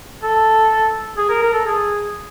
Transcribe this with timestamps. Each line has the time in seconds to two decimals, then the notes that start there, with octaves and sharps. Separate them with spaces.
0.22 A4
1.17 G#4
1.29 A#4
1.42 A#4
1.53 A4
1.66 G#4